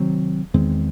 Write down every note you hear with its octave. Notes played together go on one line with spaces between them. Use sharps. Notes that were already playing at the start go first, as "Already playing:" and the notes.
Already playing: C3 D#3 F#3 C4
E2 D#3 G#3 C4